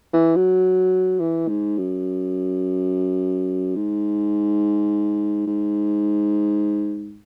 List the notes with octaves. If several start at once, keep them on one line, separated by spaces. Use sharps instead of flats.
E3
F#3
E3
G#2
F#2
G#2
G#2